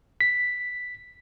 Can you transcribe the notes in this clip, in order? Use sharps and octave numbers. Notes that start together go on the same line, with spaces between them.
B6